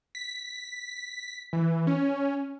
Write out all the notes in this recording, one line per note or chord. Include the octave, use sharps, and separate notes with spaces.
B6
E3
C#4